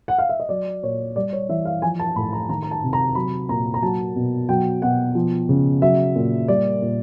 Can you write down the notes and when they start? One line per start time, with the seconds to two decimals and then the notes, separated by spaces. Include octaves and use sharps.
0.08 F#5
0.18 F5
0.29 E5
0.40 D#5
0.49 F#3 D5
0.83 A#2 C#5
1.16 G3 D5
1.33 C#5
1.49 E3 E5
1.65 F5
1.82 F3 G#5
2.00 A5
2.16 A2 B5
2.33 A#5
2.49 D#3 A#5
2.63 A#5
2.71 A5
2.83 C3
2.93 A#5
3.15 F#3 B5
3.49 A#2 A#5
3.74 A#5
3.82 F#3 A5
4.16 B2
4.49 F#3 G5
4.82 B2 F#5
5.15 F3
5.49 C#3
5.82 F#3 E5
6.16 A#2
6.48 G3 D5
6.82 A#2